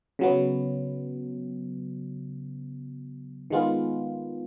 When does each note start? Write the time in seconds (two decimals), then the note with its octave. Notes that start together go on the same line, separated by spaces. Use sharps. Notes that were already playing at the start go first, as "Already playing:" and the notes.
0.19 C#3 F#3 B3
3.50 D#3 G#3 B3 F4